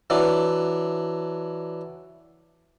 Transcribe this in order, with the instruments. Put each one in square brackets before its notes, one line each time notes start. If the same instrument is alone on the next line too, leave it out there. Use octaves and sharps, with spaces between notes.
[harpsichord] E3 F#3 D4